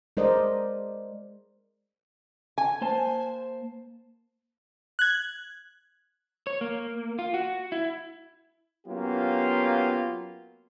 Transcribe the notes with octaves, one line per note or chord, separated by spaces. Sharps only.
G#3 A#4 C5 D5 D#5
G#5
A#3 C5 A5
F#6 G#6
C#5
A#3
F4
F#4
E4
F#3 A#3 B3 C#4 F4 G4